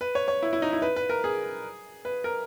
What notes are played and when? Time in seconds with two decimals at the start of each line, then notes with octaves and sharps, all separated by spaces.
0.01 B4
0.15 C#5
0.28 C#5
0.43 E4
0.53 E4
0.62 D#4
0.73 E4
0.82 B4
0.96 B4
1.09 A#4
1.24 G#4
2.05 B4
2.24 A#4